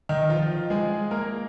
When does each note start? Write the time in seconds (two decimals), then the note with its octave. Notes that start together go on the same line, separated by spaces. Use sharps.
0.09 D#3 D#4
0.29 F3 F4
0.70 G#3 G#4
1.11 A#3 A#4